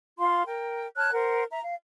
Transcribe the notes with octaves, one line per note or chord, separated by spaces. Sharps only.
F4 F5 C6
A#4 G5
C#5 A5 F6 F#6
A#4 C5 F#5
E5 A#5
F5